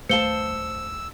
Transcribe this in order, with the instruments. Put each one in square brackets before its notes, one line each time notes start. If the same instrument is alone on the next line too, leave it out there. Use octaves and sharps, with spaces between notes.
[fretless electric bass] D#1 A3 [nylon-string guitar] C5 F5 A5 [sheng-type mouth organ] E6 [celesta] C#7 G7